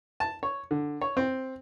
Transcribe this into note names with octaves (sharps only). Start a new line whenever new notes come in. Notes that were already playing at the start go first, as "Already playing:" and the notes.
A5
C#5
D3
C#5
C4